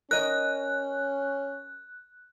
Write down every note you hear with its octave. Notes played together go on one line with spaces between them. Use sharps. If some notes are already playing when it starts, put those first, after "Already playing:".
C#4 A#4 D#5 F#6